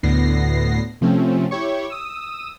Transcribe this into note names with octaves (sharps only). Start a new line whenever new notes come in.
D2 A2 D3 B3 A#6 C7
C3 F3 A3 C4 C#4
E4 G4 C#5 C#6
D#6 E6